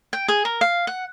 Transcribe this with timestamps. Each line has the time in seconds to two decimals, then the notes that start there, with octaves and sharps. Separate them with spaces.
0.13 G5
0.28 G#4
0.45 A#4
0.61 F5
0.87 F#5